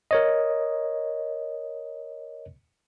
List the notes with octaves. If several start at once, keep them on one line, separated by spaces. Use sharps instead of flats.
A#4 C#5 D#5